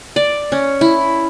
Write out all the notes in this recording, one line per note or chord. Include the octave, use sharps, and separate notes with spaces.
D5
C#4
E4